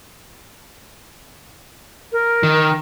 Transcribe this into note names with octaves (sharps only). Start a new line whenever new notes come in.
A#4
D#3